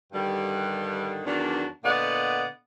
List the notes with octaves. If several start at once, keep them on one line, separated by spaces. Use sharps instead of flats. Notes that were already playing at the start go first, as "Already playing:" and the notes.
G2 D3 D#3 G3
E2 D#3 F#3 D4
A#2 D3 B3 D5 D#5 F#5